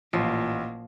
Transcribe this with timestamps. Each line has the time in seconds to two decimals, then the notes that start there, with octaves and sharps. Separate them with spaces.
0.13 A1 A#2 F3